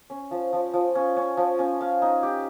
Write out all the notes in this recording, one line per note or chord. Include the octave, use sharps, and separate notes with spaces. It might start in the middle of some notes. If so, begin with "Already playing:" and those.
C#4
F3
F3
F3
C#4
C#4
F3
C#4
F5
D#4
G4